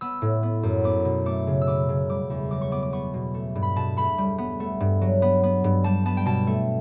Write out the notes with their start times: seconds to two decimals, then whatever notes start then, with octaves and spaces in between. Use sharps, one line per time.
0.01 B3 E6
0.22 A2
0.43 B3
0.63 F#2
0.84 B3 D6
1.05 B2
1.26 A3 D6
1.47 C#3
1.62 E6
1.67 B3 D6
1.89 C#3
2.09 G3 D6
2.30 E2
2.51 F#3 D6
2.61 C#6
2.71 B3 D6
2.83 D6
2.93 B3 C#6
3.14 B2
3.34 A3
3.55 G2
3.62 B5
3.76 B2 A5
3.97 A3 B5
4.18 G3
4.38 B3
4.60 A3
4.80 G2
5.01 F#3
5.22 B3
5.43 B3
5.64 G2
5.84 G3 A5
6.05 B3 A5
6.17 G5
6.26 B2 A5
6.47 A3